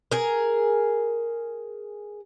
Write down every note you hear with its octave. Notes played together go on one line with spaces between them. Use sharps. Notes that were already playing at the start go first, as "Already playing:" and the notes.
G#4 A#4